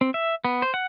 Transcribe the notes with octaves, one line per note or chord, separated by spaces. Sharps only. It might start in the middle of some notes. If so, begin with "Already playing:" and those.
C4
E5
B3
C5
F#5